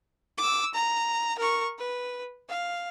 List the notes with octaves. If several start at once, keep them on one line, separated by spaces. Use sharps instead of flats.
D6 E6
A#5
A#4 C#6
B4
F5